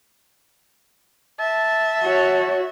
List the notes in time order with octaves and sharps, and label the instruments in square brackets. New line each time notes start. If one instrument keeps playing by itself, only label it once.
[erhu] E5 [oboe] A5
[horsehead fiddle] F#4 C#5